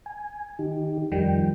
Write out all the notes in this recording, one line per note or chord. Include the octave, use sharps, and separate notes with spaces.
G#5
D#3 D#4 G4
F2 D#3 F3 G3 D#4 G5